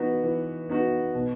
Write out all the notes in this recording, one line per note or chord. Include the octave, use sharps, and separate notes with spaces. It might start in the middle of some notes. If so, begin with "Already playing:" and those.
Already playing: E3 B3 D#4 F#4
E3
B3 D#4 F#4
B2